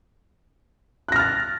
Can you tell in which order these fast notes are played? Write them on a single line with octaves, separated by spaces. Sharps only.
F#6 A#6 F6 A6